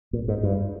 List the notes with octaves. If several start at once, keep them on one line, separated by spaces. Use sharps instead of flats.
A#2
G#2
G2